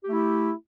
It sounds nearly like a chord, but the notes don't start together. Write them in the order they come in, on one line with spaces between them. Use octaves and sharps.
G4 A3 E4